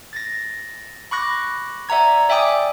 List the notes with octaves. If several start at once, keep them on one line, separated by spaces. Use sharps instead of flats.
A6 A#6
B5 C#6 D6 F#6 A#6
D5 E5 F#5 A#5 G#6
D5 E5 G5 G#5 D6 D#6